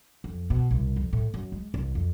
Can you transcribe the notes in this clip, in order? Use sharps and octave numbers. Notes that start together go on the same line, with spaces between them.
F2
B2
C2
F2
A2
F#2
G#3
C2
F2